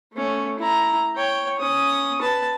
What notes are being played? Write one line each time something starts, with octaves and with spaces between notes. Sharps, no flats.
A3 C#4
E4 A#5
C#5 G5
C#4 D#6
B4 A5